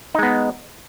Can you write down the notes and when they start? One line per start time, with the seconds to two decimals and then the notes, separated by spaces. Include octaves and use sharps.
0.15 D#4
0.19 G#3
0.23 B3